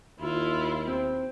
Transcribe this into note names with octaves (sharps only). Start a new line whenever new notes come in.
D#2 E4 F4
C4